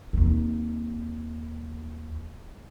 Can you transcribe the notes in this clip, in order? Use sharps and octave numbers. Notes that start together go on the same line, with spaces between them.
D#2 C4